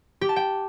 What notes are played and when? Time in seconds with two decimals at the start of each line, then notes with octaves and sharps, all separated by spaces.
0.21 G4
0.29 A5
0.36 G5